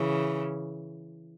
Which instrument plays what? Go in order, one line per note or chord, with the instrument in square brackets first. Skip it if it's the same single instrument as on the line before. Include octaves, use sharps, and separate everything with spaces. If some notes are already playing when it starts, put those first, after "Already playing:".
Already playing: [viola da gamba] C#3 E3